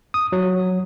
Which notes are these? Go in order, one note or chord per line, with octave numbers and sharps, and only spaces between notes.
D#6
F#3